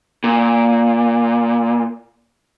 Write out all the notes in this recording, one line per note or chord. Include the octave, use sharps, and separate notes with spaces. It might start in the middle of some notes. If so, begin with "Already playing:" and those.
A#2